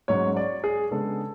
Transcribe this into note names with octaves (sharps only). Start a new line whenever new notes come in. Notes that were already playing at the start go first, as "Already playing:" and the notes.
G#2 F#3 C#4 C#5
D5
G#4
C#3 G#3 B3 D4 A4